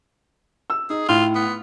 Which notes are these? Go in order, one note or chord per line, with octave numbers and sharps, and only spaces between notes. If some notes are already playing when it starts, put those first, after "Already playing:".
E6
D#4 G#4
A2 F4
B3